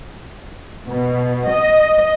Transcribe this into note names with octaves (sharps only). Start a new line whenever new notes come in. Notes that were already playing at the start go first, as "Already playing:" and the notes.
B2
D#5